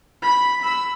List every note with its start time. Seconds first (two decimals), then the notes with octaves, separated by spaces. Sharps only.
0.22 B5
0.61 B5 E6